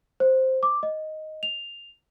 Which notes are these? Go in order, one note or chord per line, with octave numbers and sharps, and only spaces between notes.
C5
D6
D#5
F7